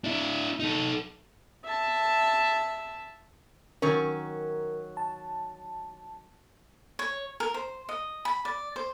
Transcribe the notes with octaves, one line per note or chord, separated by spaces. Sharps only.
D4 E4
D#4 A4
E5 A5
D#3 F#3 C#4 A#4
A5
C#5
A#4
C5
D#5
B5
D5
C5